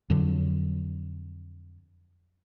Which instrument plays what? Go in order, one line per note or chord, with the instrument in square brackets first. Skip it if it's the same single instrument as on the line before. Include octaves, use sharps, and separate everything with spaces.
[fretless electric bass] F2 D3 F#3